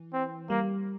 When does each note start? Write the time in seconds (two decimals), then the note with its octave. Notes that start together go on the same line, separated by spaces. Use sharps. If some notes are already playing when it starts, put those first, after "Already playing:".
Already playing: E3
0.13 C4
0.49 G3 A#3